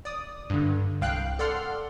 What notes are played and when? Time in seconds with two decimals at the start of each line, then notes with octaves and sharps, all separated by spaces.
0.05 D5 D#6
0.50 G2 D3
1.01 C2 F5 G5 F#6
1.39 A4 D5 F#5 C6 F6